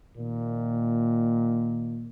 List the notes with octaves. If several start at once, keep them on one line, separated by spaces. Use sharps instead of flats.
A#2 D#3